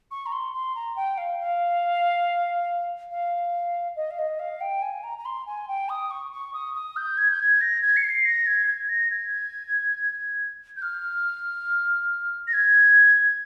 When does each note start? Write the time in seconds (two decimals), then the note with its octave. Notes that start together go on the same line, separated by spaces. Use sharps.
0.11 C#6
0.26 A#5
0.32 C6
0.53 C6
0.75 A#5
0.96 G5
1.18 F5
1.39 F5
3.11 F5
3.96 D#5
4.11 F5
4.18 D#5
4.39 F5
4.61 G5
4.82 G#5
5.04 A#5
5.18 A#5
5.25 C6
5.46 G#5
5.68 G5
5.89 D#6
6.11 C#6
6.32 C#6
6.54 D#6
6.75 D#6
6.97 G6
7.18 G#6
7.31 G6
7.40 G#6
7.61 A#6
7.82 G#6
7.96 C#7
8.03 C7
8.25 A#6
8.46 G#6
8.68 G#6
8.89 A#6
9.11 G#6
10.77 G6
10.82 F6
12.47 A#6
12.53 G#6